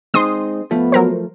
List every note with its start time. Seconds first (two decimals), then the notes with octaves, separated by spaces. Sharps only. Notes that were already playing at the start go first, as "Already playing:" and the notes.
0.14 G#3 C4 D#4 C6 D#6
0.71 F3 A3 B3
0.92 F#3 A#4 C5